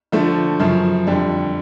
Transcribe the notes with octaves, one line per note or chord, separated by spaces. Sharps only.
D3 F3 A3
F#2 C#3 F3
F2 D3 G3